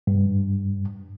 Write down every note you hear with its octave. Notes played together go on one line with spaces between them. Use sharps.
G2